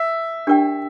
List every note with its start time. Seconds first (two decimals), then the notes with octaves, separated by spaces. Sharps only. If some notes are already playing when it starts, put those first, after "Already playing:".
Already playing: E5
0.47 D4 G4 A#4 D5 G5